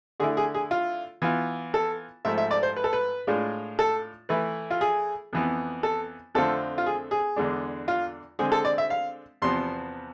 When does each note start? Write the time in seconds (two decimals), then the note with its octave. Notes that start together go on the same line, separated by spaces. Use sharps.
0.20 D3 A3 E4 G#4
0.37 G#4
0.54 G#4
0.71 F4
1.22 E3 B3 F4
1.74 A4
2.25 G#2 F3 A3 E5
2.38 E5
2.51 D5
2.63 C5
2.76 B4
2.84 A4
2.93 B4
3.27 A2 G#3 D4 F4
3.79 A4
4.29 E3 A3 E4 B4
4.70 F4
4.81 G#4
5.33 F2 E3 B3
5.83 A4
6.35 F2 D3 A3 C4 F4 A4
6.78 F4
6.86 G#4
7.11 G#4
7.36 E2 D3 G#3 D4
7.88 F4
8.39 D3 G#3 C4 G#4
8.52 A4
8.65 D5
8.78 E5
8.90 F5
9.42 E2 C3 F3 B3 C6